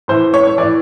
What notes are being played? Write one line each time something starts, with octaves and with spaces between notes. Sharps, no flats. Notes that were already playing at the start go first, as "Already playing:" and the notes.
A2 E3 C5
C#5
C#5
A2 E3 D5